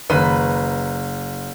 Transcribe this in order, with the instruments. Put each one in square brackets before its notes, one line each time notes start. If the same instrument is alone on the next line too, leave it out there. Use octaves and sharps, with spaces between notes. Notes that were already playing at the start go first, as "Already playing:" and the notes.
[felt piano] F#1 [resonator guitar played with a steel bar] D#3 B4